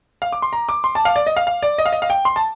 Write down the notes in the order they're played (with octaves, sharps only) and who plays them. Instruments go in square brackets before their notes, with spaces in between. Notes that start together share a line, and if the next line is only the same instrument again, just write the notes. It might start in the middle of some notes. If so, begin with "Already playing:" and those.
[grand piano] F5
D6
C6
A#5
D6
C6
A5
F5
D5
D#5
F5
F5
D5
D#5
F5
D#5
F5
G5
C6
A5